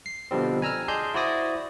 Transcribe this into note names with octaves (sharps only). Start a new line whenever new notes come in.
C7
B2 D3 F3 G3 C4
G#5 A#5 E6 F6
G#4 D5 D#5 A5 C6 G6
E4 F#4 C5 D5 D#6 A#6